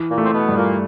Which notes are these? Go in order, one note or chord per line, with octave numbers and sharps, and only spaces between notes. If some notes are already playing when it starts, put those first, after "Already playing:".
Already playing: E3
A#2 A#3
A3
C4
B2 B3
G2
A#2 A#3